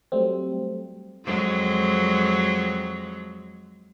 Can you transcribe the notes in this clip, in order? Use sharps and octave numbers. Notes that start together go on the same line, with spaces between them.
F#3 G3 A3 C4
F2 F#3 G#3